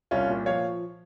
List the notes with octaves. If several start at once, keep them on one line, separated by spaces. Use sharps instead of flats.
C2 C#4 F4
A#2
F3 C#5 F5